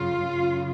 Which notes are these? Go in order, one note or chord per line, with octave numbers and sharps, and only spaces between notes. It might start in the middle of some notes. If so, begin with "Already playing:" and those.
Already playing: F#2 C#3 F4
F#2 C#3